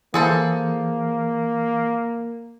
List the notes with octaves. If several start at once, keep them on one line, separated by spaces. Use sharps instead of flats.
E3 A#3 G#4 A4 C5